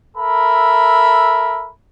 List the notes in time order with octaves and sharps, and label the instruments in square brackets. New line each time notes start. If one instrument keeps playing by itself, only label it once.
[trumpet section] A4 A#4 E5 B5